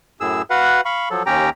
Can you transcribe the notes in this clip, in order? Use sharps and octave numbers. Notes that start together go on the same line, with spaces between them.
F#2 A2 G#4 E6
F#4 B4 F5 F#5
F5 B5 C#6
F3 F#3 A4
D#2 C#4 G4 G5 A#5